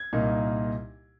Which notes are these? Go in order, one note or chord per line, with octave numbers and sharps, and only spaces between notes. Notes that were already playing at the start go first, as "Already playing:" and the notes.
Already playing: G#6
C2 A#2 A#3 D#4